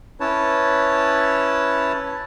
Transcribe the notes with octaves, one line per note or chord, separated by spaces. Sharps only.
C#4 E4 B4 C#5 A5